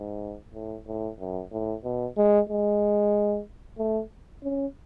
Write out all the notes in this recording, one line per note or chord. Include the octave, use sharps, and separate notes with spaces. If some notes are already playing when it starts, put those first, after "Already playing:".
Already playing: G#2
A2
A2
F#2
A2
B2
G#3
G#3
A3
C#4